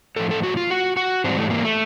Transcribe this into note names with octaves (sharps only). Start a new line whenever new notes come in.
A2 F3 A4
A4
F#4
F4
F#4
F#4
G#2 E3 G3 C4
A3
A#3
A3